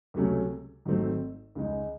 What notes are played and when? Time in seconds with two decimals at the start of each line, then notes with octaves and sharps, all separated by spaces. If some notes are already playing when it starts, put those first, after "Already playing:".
0.14 C#2 C3 F#3 A3 C#4
0.85 G#1 G#2 F#3 A3 C4
1.55 C#2 C#3 G#3 D#4